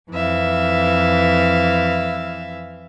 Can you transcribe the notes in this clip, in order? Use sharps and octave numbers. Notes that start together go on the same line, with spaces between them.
F2 E3 E5 F5